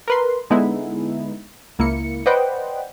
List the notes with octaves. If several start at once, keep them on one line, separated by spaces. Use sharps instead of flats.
A#4 B4 C6
D3 G#3 B3 D#4 E4
C#2 A#3 E4 C#7
B4 C5 D5 D#5 F#5 G5